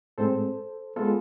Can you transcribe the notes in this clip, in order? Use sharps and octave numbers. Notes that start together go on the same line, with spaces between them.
A2 G#3 C4 A4 C5
G#3 B3 F4 A4